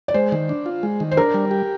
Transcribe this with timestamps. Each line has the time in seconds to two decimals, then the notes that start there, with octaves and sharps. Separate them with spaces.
0.08 D5
0.14 G#3 C5
0.32 D#3
0.49 D4
0.66 F4
0.83 G#3
1.00 D#3
1.11 C5
1.17 D4 A#4
1.34 G3
1.51 G4